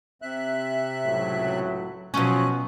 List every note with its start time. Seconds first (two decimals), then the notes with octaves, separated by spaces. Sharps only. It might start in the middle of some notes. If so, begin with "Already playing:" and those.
0.22 C3 E5 F#6
1.06 C#2 A2 F#3
2.14 B2 F3 F#3 C#4 F#6